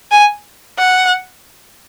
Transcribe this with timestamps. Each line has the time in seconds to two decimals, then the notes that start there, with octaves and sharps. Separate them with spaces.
0.11 G#5
0.78 F#5